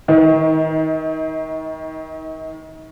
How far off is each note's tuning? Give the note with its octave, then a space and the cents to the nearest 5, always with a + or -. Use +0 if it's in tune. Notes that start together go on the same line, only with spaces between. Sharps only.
D#3 +25 D#4 +40